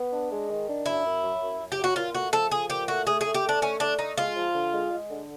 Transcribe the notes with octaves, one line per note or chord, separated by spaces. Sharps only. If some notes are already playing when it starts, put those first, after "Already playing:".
Already playing: B3
D4
G#3
D#3
D4
F#2 E4
F#2
F#3
F#2
F#2
G4
F#3
F#4
A#2 F4
A3 F#4
F3 A4
F3 G#4
A#2 G4
A3 F#4
A3 G#4
G#4
A3
G4
A3 D4
A3 C#4
A3 D4
A3 D#4
G#3 F4
F3
D3
G#3
G#3
D3